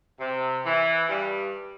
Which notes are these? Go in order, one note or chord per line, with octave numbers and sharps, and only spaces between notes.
C3
E3
G2 G3